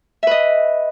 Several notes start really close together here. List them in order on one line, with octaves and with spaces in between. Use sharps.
E5 B4 D#5